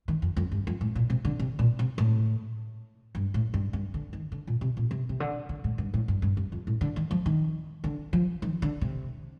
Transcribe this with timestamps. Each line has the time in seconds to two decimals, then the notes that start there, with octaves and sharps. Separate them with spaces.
0.08 D#3
0.22 F2
0.37 F2
0.52 G2
0.67 F2
0.81 A2
0.96 A#2
1.10 C3
1.25 D3
1.40 C3
1.59 A#2
1.79 C3
1.98 A2
3.15 G2
3.34 A2
3.54 G2
3.73 G2
3.94 D3
4.13 D#3
4.32 D3
4.47 A#2
4.61 C3
4.77 A#2
4.91 C3
5.09 C3
5.20 D3
5.49 D3
5.64 A2
5.78 G2
5.94 A2
6.08 G2
6.22 G2
6.37 G2
6.52 F2
6.67 A2
6.81 D3
6.96 D#3
7.11 F3
7.26 D#3
7.84 D3
8.13 F3
8.42 D#3
8.62 D3
8.81 C3